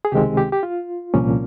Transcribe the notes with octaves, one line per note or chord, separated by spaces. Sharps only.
G#4
C#2 C3 D#3 G#3 C4 G4
G4
G4
F4
C2 A#2 F3 A#3 C#4